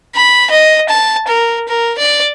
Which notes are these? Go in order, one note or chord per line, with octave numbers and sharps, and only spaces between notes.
B5
D#5
A5
A#4
A#4
D5